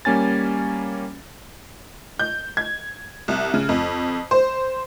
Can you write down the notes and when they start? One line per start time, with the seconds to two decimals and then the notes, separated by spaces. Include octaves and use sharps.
0.05 G3 A#3 C#4 G#5 A6
2.19 G6
2.57 G#6
3.28 C2
3.54 C#3
3.69 F2
4.31 C5